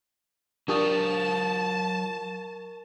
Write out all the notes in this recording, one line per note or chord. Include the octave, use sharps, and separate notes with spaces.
F#3 D4 F4 G4 A#4 A5 C#6 D#6